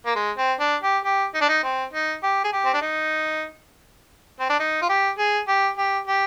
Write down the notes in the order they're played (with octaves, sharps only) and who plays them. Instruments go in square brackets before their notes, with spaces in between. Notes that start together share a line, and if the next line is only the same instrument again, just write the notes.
[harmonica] A#3
G#3
C4
D4
G4
G4
D#4
D4
D#4
C4
D#4
G4
G#4
G4
C4
D4
D#4
C4
D4
D#4
F4
G4
G#4
G4
G4
G4